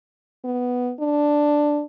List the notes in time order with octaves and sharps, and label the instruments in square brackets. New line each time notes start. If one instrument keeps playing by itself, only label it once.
[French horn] B3
D4